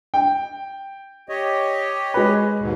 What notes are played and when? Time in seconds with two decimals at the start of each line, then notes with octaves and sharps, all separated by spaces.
0.14 G5
1.29 G4 C#5 D#5
2.14 G#3 B4
2.60 D#2 G#2 B2